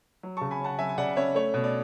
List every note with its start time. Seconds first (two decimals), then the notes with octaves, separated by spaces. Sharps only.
0.23 F#3
0.37 A5 C#6
0.41 C#3
0.51 G#5 B5
0.61 C#4 F#5 A5
0.79 F#3 E5 G#5
0.89 G#5
0.98 C#3 D5 F#5
1.16 C#4 C#5 E5
1.35 A3 C#5
1.54 B2
1.64 D5